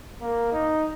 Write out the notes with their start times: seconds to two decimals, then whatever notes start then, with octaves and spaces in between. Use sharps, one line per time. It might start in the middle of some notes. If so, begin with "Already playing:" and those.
0.21 A#3
0.52 D#4